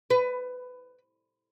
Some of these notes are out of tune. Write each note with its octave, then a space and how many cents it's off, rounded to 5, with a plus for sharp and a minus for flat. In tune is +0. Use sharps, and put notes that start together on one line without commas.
B4 +20